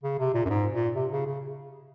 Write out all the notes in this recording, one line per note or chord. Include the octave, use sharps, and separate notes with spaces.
C#3
C3
A#2
F#2
G#2
A#2
C3
C#3
C#3